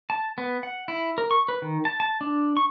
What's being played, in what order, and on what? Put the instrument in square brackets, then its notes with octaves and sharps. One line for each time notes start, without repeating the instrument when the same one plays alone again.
[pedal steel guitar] A5
B3
F#5
E4
A#4
C#6
B4
D#3
A5
A5
D4
C#6